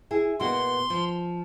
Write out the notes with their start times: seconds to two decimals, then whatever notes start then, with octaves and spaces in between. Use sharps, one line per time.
0.11 E4 G#4
0.40 B2 A#3 F#4 C6
0.90 F3